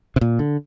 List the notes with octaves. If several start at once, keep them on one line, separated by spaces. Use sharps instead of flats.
C3
A#2
D3